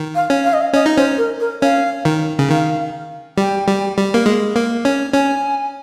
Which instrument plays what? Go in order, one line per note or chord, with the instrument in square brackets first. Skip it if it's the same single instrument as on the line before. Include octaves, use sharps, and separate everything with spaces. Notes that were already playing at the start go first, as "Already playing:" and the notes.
Already playing: [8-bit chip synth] D#3
[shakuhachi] F5
[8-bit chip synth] C#4
[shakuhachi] F5
D#5
F5
[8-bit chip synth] C#4 [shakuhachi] D#5
[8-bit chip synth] D#4
[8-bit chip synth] C#4 [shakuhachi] C5
[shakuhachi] A#4
A#4
[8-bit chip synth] C#4 [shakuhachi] F5
[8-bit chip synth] D#3
C#3
[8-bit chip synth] D#3 [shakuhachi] F5
[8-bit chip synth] G3 [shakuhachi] G5
[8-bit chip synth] G3
G3
A#3
G#3
A#3
C#4
[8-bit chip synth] C#4 [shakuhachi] G#5